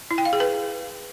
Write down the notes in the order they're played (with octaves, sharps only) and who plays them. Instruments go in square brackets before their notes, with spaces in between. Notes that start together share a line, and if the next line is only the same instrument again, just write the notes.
[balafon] E4
G5
F5
G#4
B4